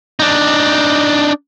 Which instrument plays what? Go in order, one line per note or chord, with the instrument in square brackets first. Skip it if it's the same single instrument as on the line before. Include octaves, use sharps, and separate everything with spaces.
[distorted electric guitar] D4 D#4